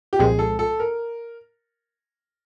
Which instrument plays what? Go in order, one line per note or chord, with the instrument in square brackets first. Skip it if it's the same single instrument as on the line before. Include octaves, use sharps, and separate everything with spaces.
[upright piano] G4
[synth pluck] C2 A#2 F3 G#3 C4 [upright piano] G#4
[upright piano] A4
A4
A#4